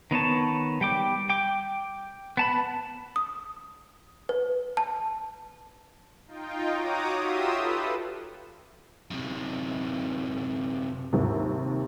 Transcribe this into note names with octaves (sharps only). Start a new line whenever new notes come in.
D#3 B3 C#5 A5
G3 G5 D6
G5 D6
B3 A5 B5
D#6
B4
A5
D#4 F4 G5
F#4 C#5 A#5 D6 D#6
F4 G4 E5 C6 D#6 E6
A4 B4
F#2 C3
D#2 C3